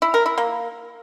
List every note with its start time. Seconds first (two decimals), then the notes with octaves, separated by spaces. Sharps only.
0.02 E4
0.14 A#4
0.26 E4
0.38 A#3